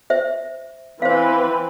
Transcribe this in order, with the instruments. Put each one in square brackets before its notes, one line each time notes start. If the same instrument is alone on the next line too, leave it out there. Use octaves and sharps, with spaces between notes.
[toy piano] C5 E5
[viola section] E3 C4 B4 [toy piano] C5 F5